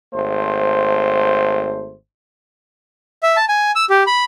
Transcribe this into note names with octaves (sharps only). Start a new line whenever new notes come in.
G#1 A3 C5
E5
A5
G#5
E6
G4
B5